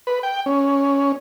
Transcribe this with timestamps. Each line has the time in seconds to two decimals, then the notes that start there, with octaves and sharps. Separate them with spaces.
0.07 B4
0.23 G5
0.46 C#4